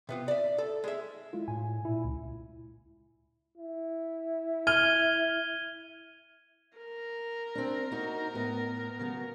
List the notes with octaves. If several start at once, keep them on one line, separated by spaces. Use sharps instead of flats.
C3 B3 F4
D5 E5
A4
G#3 E5
G#3 E4 F4
A2 G#5
A#2 E4
C#2
E4
F6 G#6 D#7 G7
A#4
C4 D4
A#3 D#4 F#4
A2 B3
C#3 F#3 B3